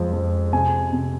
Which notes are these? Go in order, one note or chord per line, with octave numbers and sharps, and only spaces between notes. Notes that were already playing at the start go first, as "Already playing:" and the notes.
Already playing: F2 F3 G#3
F3
C3 G#5
C3